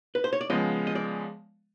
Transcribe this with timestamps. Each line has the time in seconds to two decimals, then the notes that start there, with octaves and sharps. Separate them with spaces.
0.15 B4
0.24 C5
0.33 C#5
0.41 D5
0.50 C#3 F3 G#3 B3 D#5
0.87 D#5
0.95 D5